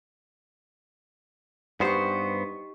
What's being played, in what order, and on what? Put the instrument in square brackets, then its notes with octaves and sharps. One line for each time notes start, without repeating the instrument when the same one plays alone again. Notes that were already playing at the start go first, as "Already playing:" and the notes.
[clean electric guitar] G2 B3 C5 [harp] D#4 G4 C#6